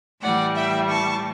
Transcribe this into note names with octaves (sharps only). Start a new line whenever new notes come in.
A2 E3 G3 D5 F#5
E5 G5
A5 C#6